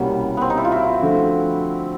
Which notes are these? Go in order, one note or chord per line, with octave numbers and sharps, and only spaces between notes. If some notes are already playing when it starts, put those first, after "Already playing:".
Already playing: C2 B2 G3 A#3 B3 C#4
B3 C4
D#4
E4
F4
E4 F#4
D3 F3 A3